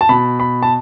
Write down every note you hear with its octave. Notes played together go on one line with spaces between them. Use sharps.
A5
B2 B5
B5
A5